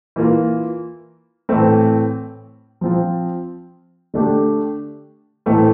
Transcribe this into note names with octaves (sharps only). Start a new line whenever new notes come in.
E3 A#3 F4
A2 E3 A3 C4
F3 C4 F4
D3 A3 D4 G4
A2 E3 A3 C4